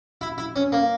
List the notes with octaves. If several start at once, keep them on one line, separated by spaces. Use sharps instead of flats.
E4
E4
C#4
A#3